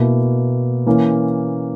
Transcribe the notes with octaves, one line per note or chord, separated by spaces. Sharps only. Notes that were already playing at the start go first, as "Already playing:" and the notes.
Already playing: B2 A#3 E4
E3 A#3 C#4